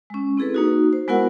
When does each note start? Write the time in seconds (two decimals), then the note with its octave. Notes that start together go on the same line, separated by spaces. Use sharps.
0.10 G#3 C#4
0.37 C4 E4 G#4 A4 B4
0.54 A#3 D#4 F#4
0.93 C5
1.08 G#3 B3 E4 F#4 A#4 F#5